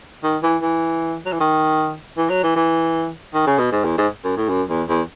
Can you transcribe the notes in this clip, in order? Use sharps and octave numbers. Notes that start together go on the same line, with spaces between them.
D#3
E3
E3
F#3
E3
D#3
E3
F#3
E3
E3
D#3
C#3
B2
G#2
E2
G#2
F#2
A2
F#2
E2
E2